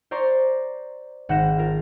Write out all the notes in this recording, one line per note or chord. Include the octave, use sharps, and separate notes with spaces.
C5 D5 A#5 C6 C#6
G#1 F#5 G6 A#6 E7
F4 A#4